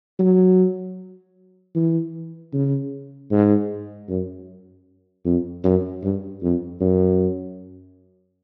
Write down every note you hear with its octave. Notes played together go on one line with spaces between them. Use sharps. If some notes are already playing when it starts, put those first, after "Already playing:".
F#3
E3
C#3
G#2
F#2
F2
F#2
G2
F2
F#2